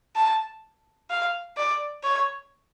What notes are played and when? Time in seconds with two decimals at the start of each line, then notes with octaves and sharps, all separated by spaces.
0.16 A5
1.10 F5
1.57 D5
2.03 C#5